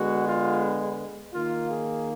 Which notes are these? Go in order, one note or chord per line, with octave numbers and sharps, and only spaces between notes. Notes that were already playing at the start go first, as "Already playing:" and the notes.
Already playing: D3 G#3 B3 F#4
F4
D#3 A#3 F4
G#4